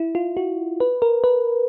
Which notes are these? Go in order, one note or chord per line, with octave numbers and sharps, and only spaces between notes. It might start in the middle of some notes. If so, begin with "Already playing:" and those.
Already playing: E4
F4
F#4
B4
A#4
B4